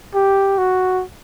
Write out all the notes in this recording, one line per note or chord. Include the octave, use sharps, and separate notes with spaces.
G4
F#4